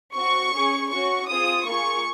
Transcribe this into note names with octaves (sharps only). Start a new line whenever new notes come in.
C4 F#4 C#6
C#4 G#4
C#4 F#4 C#6
C4 F4 G#4 D#6
A#3 F4 G#4 C#6